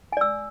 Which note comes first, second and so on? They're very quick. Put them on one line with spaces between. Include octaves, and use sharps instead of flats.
G#5 D5 E6